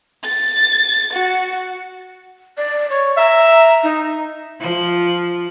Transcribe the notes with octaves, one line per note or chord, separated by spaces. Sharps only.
A6
F#4
D5
C#5
E5 A#5
D#4
F3